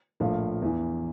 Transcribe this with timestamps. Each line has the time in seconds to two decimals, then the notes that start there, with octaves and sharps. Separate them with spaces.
0.20 A#1 A2 F3 F5
0.62 E2 E3